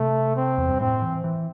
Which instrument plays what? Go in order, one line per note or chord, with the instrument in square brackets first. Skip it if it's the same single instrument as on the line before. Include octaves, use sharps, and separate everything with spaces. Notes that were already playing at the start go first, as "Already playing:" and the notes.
Already playing: [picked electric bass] C3 [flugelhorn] A3
[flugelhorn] C4
[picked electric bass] E2
G2
[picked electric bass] A2 [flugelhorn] C4
[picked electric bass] E3
E3